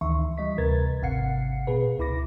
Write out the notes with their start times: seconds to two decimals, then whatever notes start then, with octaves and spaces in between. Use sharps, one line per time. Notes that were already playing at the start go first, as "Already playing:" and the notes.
0.01 D2 D#3 E3 E5 C6 C#6
0.38 E3 G3 D#5 B6
0.58 D2 C3 A#4 B4 G#6 A6
1.02 G#1 C3 F5 F#5 C7 C#7
1.67 B2 G#4 B4
1.99 C#2 E4 B5 D6 A#6